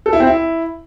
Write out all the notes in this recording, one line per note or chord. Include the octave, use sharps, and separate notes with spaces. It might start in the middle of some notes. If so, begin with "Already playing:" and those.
A4
E4
C4
E4